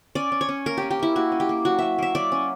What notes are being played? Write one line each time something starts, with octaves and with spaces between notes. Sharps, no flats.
C#4 D5
C#4
C#5
C#4
A#3 A#4
C#4 G4
G4
C#4 E4
A#3 F#4
C#4
G4
A#3
F#3 F#4
F#3 E5
A#3 E5
F#3 D5
C#4